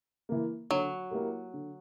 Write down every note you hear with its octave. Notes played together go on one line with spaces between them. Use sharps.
E3 A#3
D3 F#3
A#3 E4 G4 A#4
D3